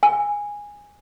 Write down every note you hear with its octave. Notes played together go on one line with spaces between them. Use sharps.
G#5